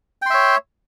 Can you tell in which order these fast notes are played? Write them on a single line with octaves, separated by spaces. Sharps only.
G5 C6 E5 C#5